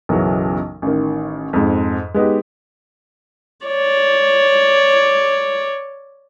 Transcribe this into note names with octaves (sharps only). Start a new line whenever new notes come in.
B1 F#2 C#3 E3 F#3
A1 D#3
F2 G#2
G#3 B3 D#4 G4
C#5 D5